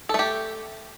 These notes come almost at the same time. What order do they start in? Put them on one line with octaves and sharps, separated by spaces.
A4 A3 G4